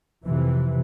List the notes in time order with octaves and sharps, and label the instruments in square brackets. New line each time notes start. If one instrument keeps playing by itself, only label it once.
[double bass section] F2 C3 E3